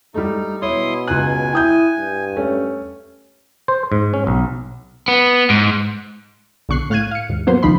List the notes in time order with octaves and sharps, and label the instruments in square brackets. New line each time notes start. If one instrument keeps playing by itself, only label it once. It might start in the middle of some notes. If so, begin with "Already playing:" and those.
[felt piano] G3 A3 [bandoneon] D#4
[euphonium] B2 [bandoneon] E4 C6 D#6 [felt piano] C#5
[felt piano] C#2 F#6 [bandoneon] G#5
[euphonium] E4 [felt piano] G5 D#6 G6
[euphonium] G2
[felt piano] A3 C#4
[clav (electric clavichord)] C5
G#2
C#4
B1
[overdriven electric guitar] B3
G#2
[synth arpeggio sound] B1 D3 C#6 F#6 C7
A2 F5 F6 F#6 G#6 D#7
F5 C#7
D#2 G#2
F#3 A#3 B3 F#4 B4 C5
C#2 D#3 F3 D#4 B5 C6